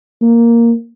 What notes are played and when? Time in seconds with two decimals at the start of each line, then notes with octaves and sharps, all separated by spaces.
0.22 A#3